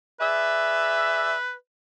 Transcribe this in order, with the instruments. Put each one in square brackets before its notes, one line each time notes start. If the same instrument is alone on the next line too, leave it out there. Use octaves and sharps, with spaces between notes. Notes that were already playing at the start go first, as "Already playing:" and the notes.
[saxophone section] G#4 D5 E5 [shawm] B4